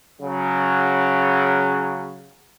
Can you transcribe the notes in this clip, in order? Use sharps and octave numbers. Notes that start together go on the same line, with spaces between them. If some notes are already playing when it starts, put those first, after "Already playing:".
C#3 F#3